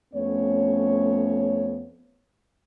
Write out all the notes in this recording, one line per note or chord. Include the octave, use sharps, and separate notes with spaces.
F2 A3 B3 C#4 C#5